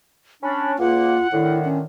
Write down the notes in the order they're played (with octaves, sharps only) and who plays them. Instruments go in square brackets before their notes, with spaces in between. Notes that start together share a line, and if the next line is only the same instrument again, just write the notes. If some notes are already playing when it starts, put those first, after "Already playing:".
[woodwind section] C#4 D4 [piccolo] B5
[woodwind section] C#2 A#3 [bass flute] F4 [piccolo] F#5
[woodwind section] A2 D3 D#3 [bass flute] E4
[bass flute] C#4